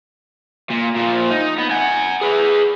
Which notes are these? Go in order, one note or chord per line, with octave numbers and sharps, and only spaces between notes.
A#2
A#2 F3
D#4
B3
F#5 G#5
G#4 B4